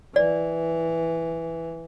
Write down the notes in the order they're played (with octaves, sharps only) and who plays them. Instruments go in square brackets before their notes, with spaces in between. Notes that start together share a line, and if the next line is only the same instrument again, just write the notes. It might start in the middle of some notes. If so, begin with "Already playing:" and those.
[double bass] E3 [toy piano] D5